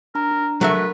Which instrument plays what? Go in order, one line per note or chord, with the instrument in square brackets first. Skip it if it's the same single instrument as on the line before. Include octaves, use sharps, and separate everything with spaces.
[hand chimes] D4 A#5 [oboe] A#4
[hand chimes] D4
[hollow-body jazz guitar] F#3 A3 E5 [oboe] F#4 [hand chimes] A#4
[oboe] B4